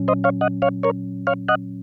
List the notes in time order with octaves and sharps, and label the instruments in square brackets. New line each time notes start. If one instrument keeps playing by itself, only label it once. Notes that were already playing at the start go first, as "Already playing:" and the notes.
Already playing: [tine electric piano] A#2 F#3 C#4
[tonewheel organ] C5 D#5
C#5 F5
D#5 F#5
C#5 F5
A#4 C#5
C#5 F5
D#5 F#5